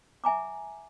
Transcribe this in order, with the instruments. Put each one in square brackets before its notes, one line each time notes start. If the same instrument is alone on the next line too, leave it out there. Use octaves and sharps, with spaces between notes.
[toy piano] E5 G#5 A#5 D6